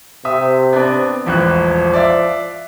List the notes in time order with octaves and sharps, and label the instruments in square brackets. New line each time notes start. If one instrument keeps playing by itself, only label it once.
[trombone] C3 [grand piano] E5 D#6
[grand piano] B3 C4 D4
[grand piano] E1 A1 F#6 [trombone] F3
[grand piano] D5 E5 F5